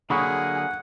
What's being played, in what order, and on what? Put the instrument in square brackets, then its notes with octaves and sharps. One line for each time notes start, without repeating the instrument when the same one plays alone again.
[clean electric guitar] D3 F#3 A#3 [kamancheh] G#4 [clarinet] F#5 [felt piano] B5 C#6 D#6